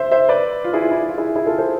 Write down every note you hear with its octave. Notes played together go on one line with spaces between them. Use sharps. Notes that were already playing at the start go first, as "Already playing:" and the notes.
Already playing: C5 E5
C5 E5
B4 D5
F4
E4 G#4
F4
E4
F4
E4 G#4
E4 G#4
F4 A4
A4 C5